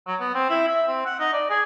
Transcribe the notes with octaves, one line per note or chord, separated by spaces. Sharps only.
F#3
B3
C4
E4
E5
C4
F#5
D#4
D5
G#4